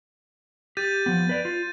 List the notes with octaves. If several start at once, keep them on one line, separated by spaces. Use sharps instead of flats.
G4 G6 A6 D#7
F3 B3
B4 D5
F4